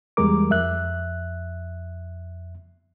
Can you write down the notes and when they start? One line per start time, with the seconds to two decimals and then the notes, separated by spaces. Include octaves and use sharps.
0.17 E2 G3 G#3 A#4 D6
0.50 F2 E5 F#6